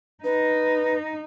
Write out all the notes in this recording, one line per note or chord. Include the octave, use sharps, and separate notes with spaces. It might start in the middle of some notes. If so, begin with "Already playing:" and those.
D#4 B4